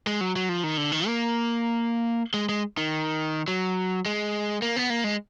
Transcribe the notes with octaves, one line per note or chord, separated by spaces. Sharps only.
G#3
F#3
F#3
F3
D#3
D3
D#3
A#3
G#3
G#3
D#3
F#3
G#3
A#3
B3
A#3
G#3